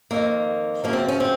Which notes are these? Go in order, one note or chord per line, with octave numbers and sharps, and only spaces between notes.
F2 D#3 A#3
F#2 C#3 F3 A#3
C4
C#4
C4